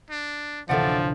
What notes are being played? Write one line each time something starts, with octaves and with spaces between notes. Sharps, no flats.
D4
A1 D2 C3 F3 A4 D5 E5 F#5